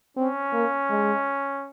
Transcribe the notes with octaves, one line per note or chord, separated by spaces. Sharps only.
C4 C#4
A#3
G#3